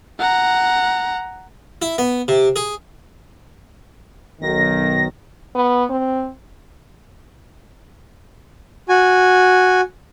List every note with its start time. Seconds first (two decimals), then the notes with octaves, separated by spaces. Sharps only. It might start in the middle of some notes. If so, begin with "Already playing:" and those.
0.19 F#5 A#5
1.82 E4
1.98 B3
2.28 C3
2.56 G#4
4.42 B1 D#3 A#6
5.55 B3
5.90 C4
8.89 F#4 G#5